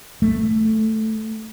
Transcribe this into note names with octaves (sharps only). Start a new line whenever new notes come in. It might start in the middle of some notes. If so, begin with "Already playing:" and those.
A3